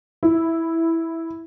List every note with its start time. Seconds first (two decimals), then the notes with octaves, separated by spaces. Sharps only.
0.23 E4